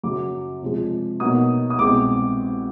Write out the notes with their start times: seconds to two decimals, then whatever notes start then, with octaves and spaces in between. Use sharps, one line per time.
0.03 F#2 C#3 F#3 D6
0.62 C3 F3 G#3
1.20 B2 F#3 A#3 D#4 D#6
1.70 D#6
1.79 C2 B2 G#3 C4 D6